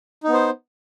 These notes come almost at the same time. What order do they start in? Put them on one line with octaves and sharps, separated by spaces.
D#4 B3 C5